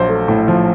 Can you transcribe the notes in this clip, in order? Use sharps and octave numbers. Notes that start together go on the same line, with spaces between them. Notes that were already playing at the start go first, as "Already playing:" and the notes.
Already playing: A#1 F#3 C5
A3
A2
F3